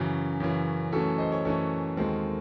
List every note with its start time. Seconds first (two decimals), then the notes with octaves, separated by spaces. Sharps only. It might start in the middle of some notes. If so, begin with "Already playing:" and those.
Already playing: F#2 C#3 E3
0.40 F#2 C#3 E3
0.92 F#2 E3 A3 C#4 F#4 A4
1.18 C5 D#5
1.32 A4 C#5
1.45 F#2 E3 A3 C#4 A4 C#5
1.97 D#2 D#3 G#3 C4 F#4 A4